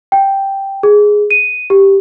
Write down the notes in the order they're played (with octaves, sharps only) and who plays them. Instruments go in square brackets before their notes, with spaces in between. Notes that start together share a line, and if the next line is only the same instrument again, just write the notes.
[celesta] G5
G#4
D#7
G4